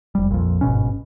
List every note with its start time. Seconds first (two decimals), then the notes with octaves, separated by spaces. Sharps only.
0.15 F1 G3
0.31 A#1 F2
0.61 G1 G#2 B2 C#4